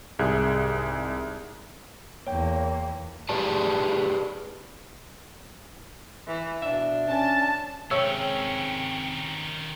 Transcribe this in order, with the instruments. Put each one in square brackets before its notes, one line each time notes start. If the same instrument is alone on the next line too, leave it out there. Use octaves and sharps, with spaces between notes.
[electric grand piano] C2 G#2 G#4 E5 F#6
[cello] E2 A#3 [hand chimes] C#5 G5
[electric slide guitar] G4 G#4 B4 D5 A5
[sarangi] E3
[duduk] B2 [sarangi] D4 [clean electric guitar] E5
[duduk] C#4 [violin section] A5
[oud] C3 G#3 [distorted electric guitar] D#3 C#4 [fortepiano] C#5 E6